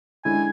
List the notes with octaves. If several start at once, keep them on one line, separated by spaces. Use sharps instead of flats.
D3 G#3 C#4 E4 G#5